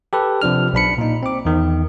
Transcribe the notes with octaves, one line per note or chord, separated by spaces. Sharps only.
G4 A4 B4
C3 F3 D4 F6
B1 D4 B5 C#7
A#2 D#4
C4 D6
E2 D#3